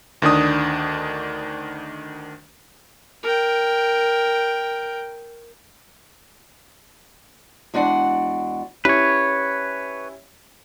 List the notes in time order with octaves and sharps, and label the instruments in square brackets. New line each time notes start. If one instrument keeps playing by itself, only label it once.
[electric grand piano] D2 D#3 D4 D#6
[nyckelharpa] A#4 G5
[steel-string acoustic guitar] E2 G#3 D4 F#4 D5 F#5
[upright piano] C#4 E4 G4 [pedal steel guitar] B4 C#5